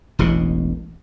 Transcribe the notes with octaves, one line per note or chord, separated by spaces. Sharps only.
E1 A1 B2